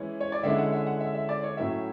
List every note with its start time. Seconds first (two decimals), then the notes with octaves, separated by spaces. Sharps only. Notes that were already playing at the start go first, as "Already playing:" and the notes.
Already playing: E3 G#3 C#4 E4
0.20 C#5
0.32 D5
0.43 D3 G#3 C#4 E4 E5
0.58 F#5
0.72 E5
0.87 F#5
1.00 E5
1.14 E5
1.29 D5
1.43 C#5
1.57 A2 F#3 C#4 E4 E5